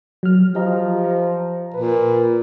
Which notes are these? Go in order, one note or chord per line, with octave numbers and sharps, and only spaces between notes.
F#3 F6
F3 G4 D#5 A#5
A#5
A#2 B4